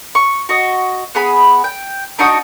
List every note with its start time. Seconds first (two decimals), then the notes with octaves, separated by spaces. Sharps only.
0.15 C#6
0.49 F#4 D#5
1.15 B3 G#4 B5
1.64 G5
2.19 D4 D#4 F#4 D#6